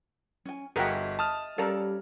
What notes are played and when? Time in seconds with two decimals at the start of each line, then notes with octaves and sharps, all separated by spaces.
0.45 C#4 G#5
0.76 G1 F#4 G#4 A#4 D#5 E5 F#5 G5
1.19 A5 D#6 F6
1.58 G3 C#4 A4 A#4 D5 F5